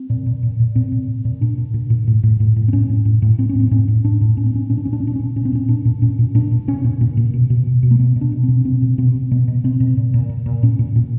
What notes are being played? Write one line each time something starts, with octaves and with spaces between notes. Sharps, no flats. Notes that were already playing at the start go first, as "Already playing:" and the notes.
Already playing: C4
A#2
A#2
A#2
A#2
A#2 C4
A#2
A#2
A#2
A#2 D4
A#2
A#2
A#2
A2
A2
A2
A2
C4
A2 C#4
A2
A2
A2
A2 C4
C#4
A2 C4
A2 C#4
A2
A2 D4
A2
A2 C#4
C4
A2 C#4
A#2 C#4
D4
A#2 C#4
D4
C#4
A#2 D4
A#2 C#4
A#2 C#4
C4
A#2 C#4
A#2 D4
A#2
A#2 C#4
A#2
A#2 D4
A#2
A#2 C#4
A#2
A#2
A#2
B2
B2
B2
B2
A#3
B2 B3
B2 D4
B2
B2 C4
B2 C4
B2
B2 C4
B2
B2 B3
B2
B2 C4
B2
A#2
A#2
A#2
A#2
A#2 C#4
A#2
A#2